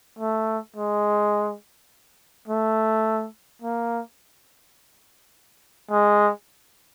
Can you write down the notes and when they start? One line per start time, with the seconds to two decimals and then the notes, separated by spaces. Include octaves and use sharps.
0.19 A3
0.76 G#3
2.48 A3
3.62 A#3
5.91 G#3